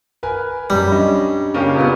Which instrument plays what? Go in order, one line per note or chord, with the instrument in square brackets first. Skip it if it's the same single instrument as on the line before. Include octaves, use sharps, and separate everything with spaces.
[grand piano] A#4 B4 G#5
[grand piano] F#2 B5 [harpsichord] G3
[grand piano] C#4 D4 D#5
[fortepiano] C#3 A#3 G4
A#2 B3